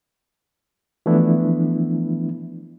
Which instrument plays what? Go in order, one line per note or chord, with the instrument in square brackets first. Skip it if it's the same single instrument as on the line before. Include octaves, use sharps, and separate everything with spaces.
[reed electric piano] E3 F3 A3 B3 D4 E4